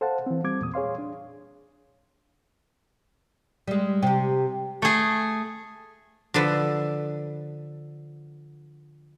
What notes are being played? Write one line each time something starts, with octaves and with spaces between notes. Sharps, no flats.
A4 C5 F5 F#5 A5
E3 C4
G3 C4 D6 G#6
E2 A#2 D#6
G#4 C#5 F5 C6
D4
G3 G#3
C3 G4 G5
A3 G#4
D3 F3 A4 B4